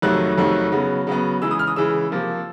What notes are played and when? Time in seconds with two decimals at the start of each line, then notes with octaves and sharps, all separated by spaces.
0.02 F2 C3 D#3 F#3 A3 F#6
0.38 F2 C3 D#3 F#3 A3
0.72 C#3 F#3 B3
1.07 C#3 F#3 B3
1.42 C#3 E3 G#3 E6
1.51 D#6
1.59 F6
1.67 D#6
1.76 C#3 E3 G#3 E6
2.11 C3 F3 A#3